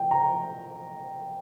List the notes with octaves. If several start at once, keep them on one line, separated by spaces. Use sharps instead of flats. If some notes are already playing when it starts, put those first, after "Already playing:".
Already playing: G5
A#5